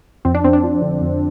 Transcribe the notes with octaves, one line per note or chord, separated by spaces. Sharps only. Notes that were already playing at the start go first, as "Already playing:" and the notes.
F2 C4
D4
F2 C4
D4
F3
D3
F2